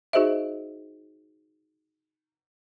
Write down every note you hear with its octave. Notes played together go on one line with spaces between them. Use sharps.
D#4 F#4 G#4 C5 D#5 E5